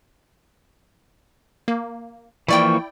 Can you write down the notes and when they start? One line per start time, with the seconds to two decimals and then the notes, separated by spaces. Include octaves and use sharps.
1.68 A#3
2.48 E3 F3 A#3 E4 D5 G5 C#6